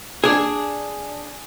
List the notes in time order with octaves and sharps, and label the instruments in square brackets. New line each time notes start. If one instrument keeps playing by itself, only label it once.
[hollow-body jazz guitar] D4 G#4